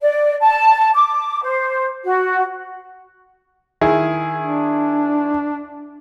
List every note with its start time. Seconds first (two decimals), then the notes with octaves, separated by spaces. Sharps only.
0.02 D5
0.41 A5
0.94 D6
1.42 C5
2.04 F#4
3.81 D#3 E4 G#4
4.41 D4